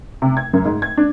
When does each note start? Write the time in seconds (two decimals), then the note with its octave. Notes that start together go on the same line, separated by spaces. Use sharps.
0.22 C3
0.37 G#6
0.54 F#2
0.65 G#2
0.82 G#6
0.97 D4